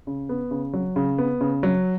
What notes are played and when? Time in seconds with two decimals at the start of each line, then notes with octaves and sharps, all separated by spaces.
0.07 C#3
0.29 B3
0.51 C#3
0.73 F#3
0.96 C#3
1.18 B3
1.41 C#3
1.63 F#3